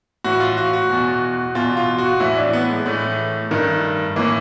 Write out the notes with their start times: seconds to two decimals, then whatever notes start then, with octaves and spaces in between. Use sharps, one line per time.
0.24 A2 E3 F#4
0.40 F4
0.57 F#4
0.73 F#4
0.90 E2 B2
1.55 E2 B2 F4
1.77 F4
1.98 F#4
2.20 A2 E3 E4
2.37 D4
2.53 B3
2.69 G#3
2.86 A2 E3 A3
3.51 G2 D#3
4.16 A2 E3 A#3